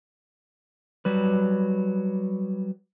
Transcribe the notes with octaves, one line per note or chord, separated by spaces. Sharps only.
F#3 G3 B4